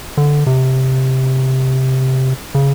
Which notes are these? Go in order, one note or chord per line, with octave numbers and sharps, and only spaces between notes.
D3
C3
C#3